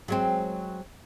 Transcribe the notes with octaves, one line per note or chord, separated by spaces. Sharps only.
F#3 G#3 C4